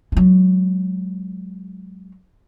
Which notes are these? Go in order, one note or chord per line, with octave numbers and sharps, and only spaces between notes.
F#3 G#3